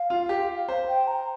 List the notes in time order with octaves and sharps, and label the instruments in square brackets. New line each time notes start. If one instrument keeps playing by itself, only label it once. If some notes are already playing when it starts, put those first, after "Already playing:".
Already playing: [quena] F5
[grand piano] F4
G4
C5
[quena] G5
A#5